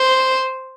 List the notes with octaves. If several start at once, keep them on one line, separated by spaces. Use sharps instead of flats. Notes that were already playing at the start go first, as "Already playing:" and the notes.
Already playing: C5